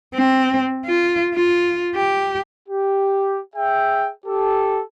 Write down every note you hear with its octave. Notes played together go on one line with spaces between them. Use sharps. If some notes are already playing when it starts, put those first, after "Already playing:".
C4
F4
F4
G4
G4
G#4 E5 G5
G4 A4